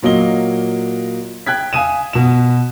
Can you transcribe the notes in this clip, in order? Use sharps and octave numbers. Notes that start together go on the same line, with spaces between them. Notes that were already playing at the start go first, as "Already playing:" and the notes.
A#2 F#3 A#3 D#5 G7
G5 F#6 G#6 B6
F5 G#5 D#6 D#7 E7
B2 E7